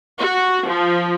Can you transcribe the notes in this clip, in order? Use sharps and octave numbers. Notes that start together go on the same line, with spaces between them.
F#4
F3